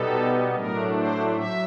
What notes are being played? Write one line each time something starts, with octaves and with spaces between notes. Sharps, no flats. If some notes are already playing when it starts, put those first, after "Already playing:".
Already playing: B2 G3 B3 D#4 A4
A2 F#3 A3 D4 A#4
C5
F#3 E5